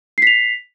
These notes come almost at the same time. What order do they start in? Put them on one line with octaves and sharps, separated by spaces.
C7 B6 F7